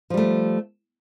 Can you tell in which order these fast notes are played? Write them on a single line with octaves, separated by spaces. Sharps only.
F3 G3 A3